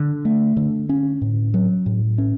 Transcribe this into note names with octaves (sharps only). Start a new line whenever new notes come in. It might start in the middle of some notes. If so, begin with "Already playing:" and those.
Already playing: D3
A3
D3
C#4
A2
F#3
A2
C#4